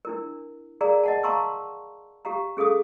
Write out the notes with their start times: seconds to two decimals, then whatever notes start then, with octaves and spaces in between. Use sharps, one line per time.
0.05 D4 E4 A#4
0.81 G#4 A#4 D5 F5 A#5
1.04 D#5 F#5 A5
1.23 F5 A5 A#5 C6 C#6 E6
2.25 G4 F5 A#5
2.57 C#4 G#4 A4 F5 D#6